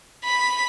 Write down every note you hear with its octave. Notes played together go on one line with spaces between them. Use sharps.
B5